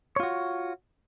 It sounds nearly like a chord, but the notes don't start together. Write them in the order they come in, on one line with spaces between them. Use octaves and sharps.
C#5 F4 F#4